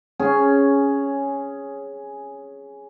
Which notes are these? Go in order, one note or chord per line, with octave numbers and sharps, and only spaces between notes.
C#4 G#4